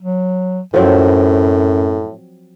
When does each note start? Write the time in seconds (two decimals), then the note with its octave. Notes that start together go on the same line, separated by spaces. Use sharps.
0.01 F#3
0.74 F#2 A2 F3 F#3 C4